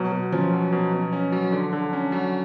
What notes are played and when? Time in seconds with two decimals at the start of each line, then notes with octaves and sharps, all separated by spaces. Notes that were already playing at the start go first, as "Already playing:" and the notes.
Already playing: B2 F#3
0.12 B2
0.32 F3 C#4
0.53 F#3
0.72 B2
0.93 B2
1.13 C#4
1.32 F#3
1.53 D3
1.73 D3
1.93 C#4
2.12 F#3